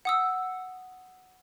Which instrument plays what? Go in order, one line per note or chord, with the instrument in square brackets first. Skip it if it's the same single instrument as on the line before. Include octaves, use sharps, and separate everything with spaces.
[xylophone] F#5 D#6 E6